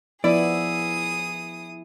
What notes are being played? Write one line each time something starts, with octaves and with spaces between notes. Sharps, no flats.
F3 B3 E4 G#4 D5 D#6